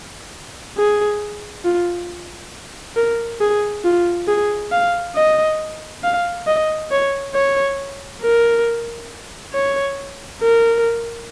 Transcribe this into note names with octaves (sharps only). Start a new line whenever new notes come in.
G#4
F4
A#4
G#4
F4
G#4
F5
D#5
F5
D#5
C#5
C#5
A#4
C#5
A#4